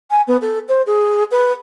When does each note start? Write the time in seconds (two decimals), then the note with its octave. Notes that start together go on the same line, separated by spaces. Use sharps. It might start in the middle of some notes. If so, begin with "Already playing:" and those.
0.11 G#5
0.27 B3
0.41 A4
0.68 C5
0.86 G#4
1.31 B4